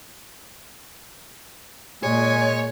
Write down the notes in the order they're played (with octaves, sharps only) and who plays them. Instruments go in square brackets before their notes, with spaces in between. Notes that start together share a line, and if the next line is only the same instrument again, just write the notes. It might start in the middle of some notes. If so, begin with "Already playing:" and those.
[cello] A#2 [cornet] G#3 [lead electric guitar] C#5 [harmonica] G#5